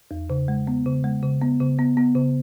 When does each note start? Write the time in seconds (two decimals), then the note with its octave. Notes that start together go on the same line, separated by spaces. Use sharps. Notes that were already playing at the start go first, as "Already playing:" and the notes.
0.11 E2
0.30 C#3
0.48 G#3
0.67 B3
0.86 C#3
1.04 G#3
1.22 C#3
1.41 B3
1.60 C#3
1.79 B3
1.97 B3
2.15 C#3